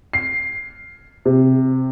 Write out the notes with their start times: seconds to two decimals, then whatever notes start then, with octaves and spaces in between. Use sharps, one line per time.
0.13 C7
1.25 C3